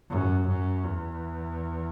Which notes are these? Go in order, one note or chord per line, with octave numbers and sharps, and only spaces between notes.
F#2
F#2
E2